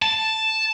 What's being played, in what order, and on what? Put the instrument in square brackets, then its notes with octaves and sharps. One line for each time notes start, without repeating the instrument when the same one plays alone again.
[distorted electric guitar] A5